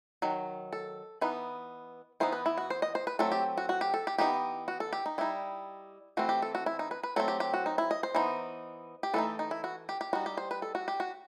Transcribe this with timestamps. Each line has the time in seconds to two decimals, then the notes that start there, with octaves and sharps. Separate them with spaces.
0.22 D#3 F#3
0.73 A4
1.21 E3 B3 D#4 B4
2.20 E3 B3 D#4 C5
2.32 B4
2.46 E4
2.58 F#4
2.70 C5
2.82 D#5
2.95 C5
3.07 B4
3.19 F#3 A3 C4 A4
3.32 G4
3.58 F#4
3.69 F#4
3.81 G4
3.94 A4
4.07 G4
4.18 E3 B3 D#4 G4
4.68 F#4
4.80 A4
4.93 G4
5.06 D#4
5.18 G3 D#4 E4
6.17 E3 A3 C4 F#4
6.29 G4
6.42 A4
6.55 F#4
6.66 E4
6.79 D#4
6.91 B4
7.03 B4
7.16 F#3 A3 C4 A4
7.28 G4
7.40 G4
7.54 F#4
7.66 D#4
7.78 E4
7.91 D#5
8.03 C5
8.15 E3 B3 D#4
9.03 G4
9.14 E3 A3 D#4 A4
9.39 D#4
9.51 E4
9.64 F#4
9.89 G4
10.01 G4
10.13 G3 D#4 F#4
10.26 G4
10.37 C5
10.51 B4
10.62 A4
10.75 F#4
10.88 G4
11.00 F#4